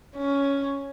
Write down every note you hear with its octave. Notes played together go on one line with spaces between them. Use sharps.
C#4